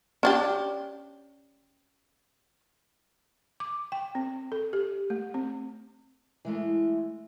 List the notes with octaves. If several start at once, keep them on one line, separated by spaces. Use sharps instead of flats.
C#4 D4 G4
D6
G5
C4
A4
G4
A3
C4
E3 G#3 A3